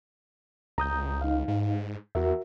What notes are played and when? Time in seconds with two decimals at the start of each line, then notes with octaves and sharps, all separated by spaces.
0.78 C#2 A#5 D#6 G6
1.21 D#4 F5
1.48 G#2
2.15 E2 F#4 A#4 E5